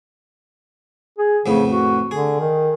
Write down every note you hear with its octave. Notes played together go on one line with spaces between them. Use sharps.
G#4
F2 A2 C#3 B3
F#4
D3 G#4
D#3